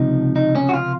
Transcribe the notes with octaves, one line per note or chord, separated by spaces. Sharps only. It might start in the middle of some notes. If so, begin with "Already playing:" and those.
Already playing: C#2 C3 F3 D#4
D#4
C#4
F#4
F4